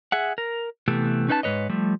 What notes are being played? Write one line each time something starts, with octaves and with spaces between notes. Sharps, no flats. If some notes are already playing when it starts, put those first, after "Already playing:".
G#4 E5 F#5
A#4
C3 E3 A3 B3 G4
C#4 D#4 B4 D#5 A5
G#2 E3 B4 C#5 D#5
F3 G3 A3